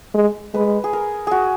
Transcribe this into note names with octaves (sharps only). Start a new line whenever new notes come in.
G#3
G#3 B4
G#4
A#4
F#4 G#4